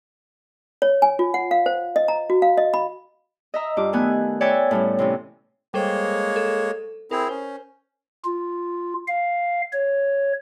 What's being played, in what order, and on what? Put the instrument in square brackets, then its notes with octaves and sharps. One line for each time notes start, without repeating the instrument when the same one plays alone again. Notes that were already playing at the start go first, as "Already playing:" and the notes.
[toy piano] C#5
G#5
F4
F#5
F5
C5
D#5
A#5
F#4
F5
D#5
B5
[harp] D#5 E5 A#5
G2 F4 D6
D#3 A3 B3 G#5 F#6
B4 C#5 D5 E5 G5 G#5
A2 G3 C#4
C3 E3 C#4
[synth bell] G3 A4 C5 [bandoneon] G#3 A#3 C#5
[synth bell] A4
[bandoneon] C4 E4 G#4 [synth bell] A#4 G6
[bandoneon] C#4 [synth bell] C5
[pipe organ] F4
F5
C#5